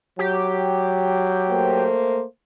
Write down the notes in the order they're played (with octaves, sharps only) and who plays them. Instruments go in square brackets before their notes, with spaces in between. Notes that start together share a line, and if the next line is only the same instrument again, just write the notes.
[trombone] F#3 [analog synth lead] G4
[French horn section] A3 A#3 C5